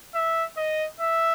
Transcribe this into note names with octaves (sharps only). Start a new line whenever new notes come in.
E5
D#5
E5